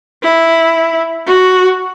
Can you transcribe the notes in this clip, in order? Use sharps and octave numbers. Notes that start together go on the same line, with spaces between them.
E4
F#4